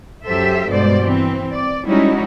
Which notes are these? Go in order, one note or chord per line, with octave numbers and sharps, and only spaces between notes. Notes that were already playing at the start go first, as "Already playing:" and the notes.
F#2 F#3 G4 A4 C5 E5
G2 B2 G#3 C5 D5
E3 C4
D5
G3 G#3 C#4 D#4 E4 F#4